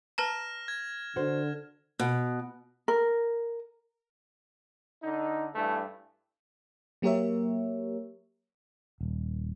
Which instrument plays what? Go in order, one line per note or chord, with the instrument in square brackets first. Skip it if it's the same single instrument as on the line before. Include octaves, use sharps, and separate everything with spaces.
[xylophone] B4 A5 A#5 [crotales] F6 A#6 E7
[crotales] G#6
[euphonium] D3 [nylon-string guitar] F#4 C5
[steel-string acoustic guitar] B2
[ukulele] A#4
[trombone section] D3 D#4
G2 E3 A3
[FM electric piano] F#3 A#3 G4 A#4 C#5 E5
[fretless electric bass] D#1